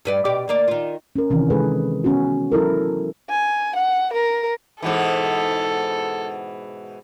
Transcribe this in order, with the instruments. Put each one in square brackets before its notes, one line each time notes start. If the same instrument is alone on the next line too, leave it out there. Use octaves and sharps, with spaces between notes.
[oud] G2 B4 D5
B2 G4 D5
D2 A#3 D5
D#3 F4
[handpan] C#4 A#4
C3 D#3 E3 C#4
C3 G#3 G#4 A4 B4
B3 C#4 F#4
F#3 E4 A4 A#4
[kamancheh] G#5
F#5
A#4
[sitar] G#2 B2 E3 [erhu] A4